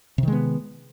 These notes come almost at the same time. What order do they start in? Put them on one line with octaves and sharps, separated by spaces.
C3 D#3 G#3 B3